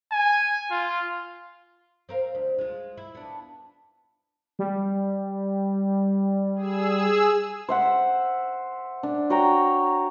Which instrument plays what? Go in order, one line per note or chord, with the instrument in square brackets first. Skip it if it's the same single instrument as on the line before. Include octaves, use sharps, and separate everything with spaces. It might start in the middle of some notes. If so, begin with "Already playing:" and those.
[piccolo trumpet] G#5
F4
[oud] C4 A#4 F5
D2
G#3 F4
E4
B3 D4
[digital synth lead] G3
[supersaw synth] G#4 E6
[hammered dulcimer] C5 E5 F#5
D4
F#4 C#5 G5 A#5